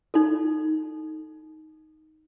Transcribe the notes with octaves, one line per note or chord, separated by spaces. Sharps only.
D#4 A4